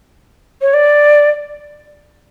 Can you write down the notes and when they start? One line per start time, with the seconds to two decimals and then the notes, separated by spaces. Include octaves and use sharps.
0.61 C#5
0.74 D5